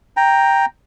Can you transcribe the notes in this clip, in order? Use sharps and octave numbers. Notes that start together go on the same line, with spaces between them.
G5 A#5